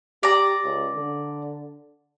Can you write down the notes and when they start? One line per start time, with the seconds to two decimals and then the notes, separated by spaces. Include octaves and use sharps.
0.23 G4 D5 A#5
0.64 C#2
0.96 D3